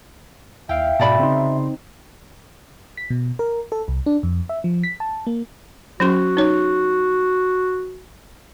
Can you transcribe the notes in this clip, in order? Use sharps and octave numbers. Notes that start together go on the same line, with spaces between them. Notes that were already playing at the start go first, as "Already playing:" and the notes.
D#2 E4 E5 F5 G5
G#2 B2 F#4 D5 A5 B5
C#3 C4 D#4 C6
B6
B2
A#4
A4
C2
D4
F2
E5
F3
B6
A5
A#3
F#3 C#4 F#4 C6
D#4 C#5